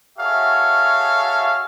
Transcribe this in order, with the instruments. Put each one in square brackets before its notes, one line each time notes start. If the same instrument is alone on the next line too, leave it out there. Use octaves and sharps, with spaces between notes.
[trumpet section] F#4 G#4 A4 C#5 E5 F5